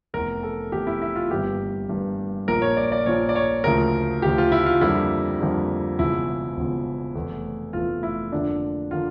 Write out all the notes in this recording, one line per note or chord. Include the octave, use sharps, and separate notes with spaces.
F1 E2 E3 A#4
A4
F1 E2 E3 G4
E4
E4
F4
G1 G2 E3 A#3 G4
G1 G2 E3 A#3
A#1 A#2 F3 A#3 A#4
C#5
D5
D5
A#1 A#2 F3 A#3 C#5
D5
C#5
D2 C#3 F3 A#4
D2 C#3 F3 G4
F4
E4
F4
F2 D3 G3 A#3 E4
F2 D3 G3 A#3
E1 E2 C#3 F3 E4
E1 E2 C#3 F3
F1 E2 E3 A3
F1 E2 E3 A3 F4
E4
F2 D3 F3 A#3 D4
D3 F3 A#3 F4